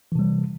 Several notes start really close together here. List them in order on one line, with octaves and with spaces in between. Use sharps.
E3 C3 G3